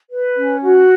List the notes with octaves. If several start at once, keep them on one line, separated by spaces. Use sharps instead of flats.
B4
C#4
F#4